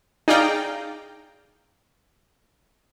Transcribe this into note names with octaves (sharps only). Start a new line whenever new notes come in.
D#4 G#4 D5 F5 G5 A#5